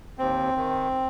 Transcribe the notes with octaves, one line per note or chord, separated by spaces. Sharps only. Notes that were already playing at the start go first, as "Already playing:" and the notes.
D#2 C4
D#3